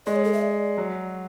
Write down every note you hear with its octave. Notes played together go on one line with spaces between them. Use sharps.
G#3 D5
C#5
A4
E5
D5
F#3